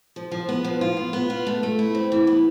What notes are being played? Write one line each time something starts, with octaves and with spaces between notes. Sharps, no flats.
F3
F3
B3
F3
F4
B3
B3
F4
A3
A3
E4
C4
E3
B3